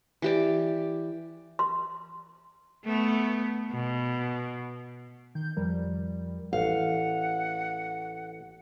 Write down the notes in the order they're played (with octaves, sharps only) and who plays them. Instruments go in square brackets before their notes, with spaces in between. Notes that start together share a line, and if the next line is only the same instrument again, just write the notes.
[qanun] E3 G4 D5
[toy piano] C6
[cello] A3 B3
B2
[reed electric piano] D#3 [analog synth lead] G6
[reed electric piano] F2 F3 A#4 [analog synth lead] G3
[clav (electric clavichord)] A1 [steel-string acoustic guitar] F5 [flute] F#5